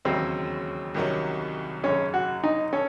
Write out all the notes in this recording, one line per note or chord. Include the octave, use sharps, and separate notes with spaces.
E1 D#2 C#3 F#3 C4 C#4
C2 C3 D#3 F#3 C#4
G#1 F#2 C#3 C#4
F#4
D#4
C#4 A4